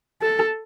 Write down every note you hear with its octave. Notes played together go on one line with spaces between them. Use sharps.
A4